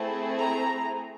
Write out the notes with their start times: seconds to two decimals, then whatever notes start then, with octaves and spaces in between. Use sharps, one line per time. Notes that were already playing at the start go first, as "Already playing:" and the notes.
Already playing: A3 C4 E4 G#4
0.37 A#5